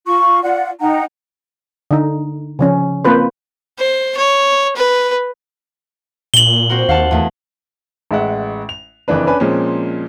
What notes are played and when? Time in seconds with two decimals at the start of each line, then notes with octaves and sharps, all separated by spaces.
0.06 F4 C#6
0.43 F4 D5 F#5
0.80 D#4 F#5 G5 A#5
1.91 D3 D#4
2.59 C#3 F3 C#4
3.05 A#3 C4 F4 B4 C5
3.79 C5
4.17 C#5
4.76 B4
6.34 A#2 F#7 G7
6.69 C4 F#4 A#4
6.89 D#2 F5 F#5 A5
7.11 E2 A3
8.11 A1 G#3 E5 F#5
8.69 F7
9.08 F#1 F2 E3 D4 B4
9.27 C#4 D4 B4 G#5 B5
9.40 A#2 F3 G#3 A#3 C4 C#4